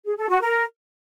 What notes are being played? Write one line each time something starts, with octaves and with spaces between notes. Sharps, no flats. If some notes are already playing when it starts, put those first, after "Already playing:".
G#4
A4
F#4
A#4